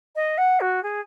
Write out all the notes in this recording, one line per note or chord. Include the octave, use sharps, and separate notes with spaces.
D#5
F#5
F#4
G#4